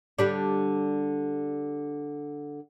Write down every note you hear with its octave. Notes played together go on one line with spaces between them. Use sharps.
D3 G3 D4